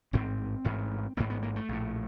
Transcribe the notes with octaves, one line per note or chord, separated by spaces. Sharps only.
A1 G#2 C4
A1 G#2
A1 G#2 A#3
B3
A#3
A3
A#1 A2